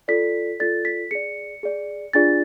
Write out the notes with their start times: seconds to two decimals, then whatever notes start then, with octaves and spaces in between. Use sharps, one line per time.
0.08 F4 A4 D5 B6
0.60 F4 A4 D5 A6
0.85 B6
1.11 G#4 D5 C#7
1.63 G#4 D5
2.13 D4 F4 G#4 D5 A6